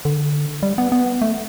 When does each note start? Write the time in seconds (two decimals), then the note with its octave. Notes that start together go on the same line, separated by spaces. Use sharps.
0.05 D3
0.63 G3
0.78 B3
0.92 B3
1.22 A3